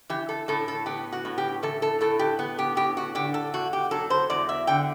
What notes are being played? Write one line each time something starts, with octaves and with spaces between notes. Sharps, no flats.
E3 G4
A4
A2 A4
A4
B3 G4
F#4
A2
G4
E3 A4
A4
A2 A4
G4
B3
G4
A2 G4
F#4
D3 G4
A4
E2 F#4
G4
F#3 A4
C5
E2 D5
E5
D3 G5